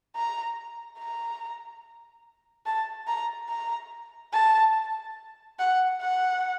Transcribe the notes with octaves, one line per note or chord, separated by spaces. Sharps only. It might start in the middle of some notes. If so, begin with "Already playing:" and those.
A#5
A#5
A5
A#5
A#5
A5
F#5
F#5